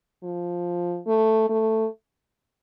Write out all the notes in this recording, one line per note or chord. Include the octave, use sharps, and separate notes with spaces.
F3
A3
A3